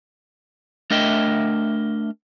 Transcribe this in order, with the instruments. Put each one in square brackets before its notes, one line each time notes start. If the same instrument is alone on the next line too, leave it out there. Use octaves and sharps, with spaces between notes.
[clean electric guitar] A3 D4 A#4 D#5 E5 G5